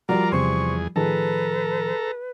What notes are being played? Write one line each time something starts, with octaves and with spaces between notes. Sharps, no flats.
F3 G3 F4 F#4 A#4 D5 A#5
E2 C3 G#4 C5 C6 C#6
A2 D#3 F3 G#4 A4 B4 A5 A#5